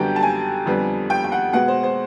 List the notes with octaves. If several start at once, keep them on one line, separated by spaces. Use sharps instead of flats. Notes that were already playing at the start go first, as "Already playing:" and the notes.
Already playing: F#2 D3 G3 B3 G5
A5
G#5
F2 D3 G3 B3
G5
G5
F#5
B2 G#3 B3 F#5
C5
C5